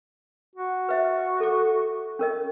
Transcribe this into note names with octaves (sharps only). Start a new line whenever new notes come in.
F#4
B4 E5
A4 D6
C#4 A#4 D#5